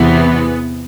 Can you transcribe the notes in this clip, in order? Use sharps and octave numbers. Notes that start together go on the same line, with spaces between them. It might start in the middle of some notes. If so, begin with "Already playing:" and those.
Already playing: E2 C3 E3 B3